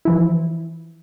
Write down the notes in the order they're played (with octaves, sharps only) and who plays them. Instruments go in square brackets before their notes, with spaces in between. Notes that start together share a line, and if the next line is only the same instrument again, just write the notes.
[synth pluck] E3 F3 E4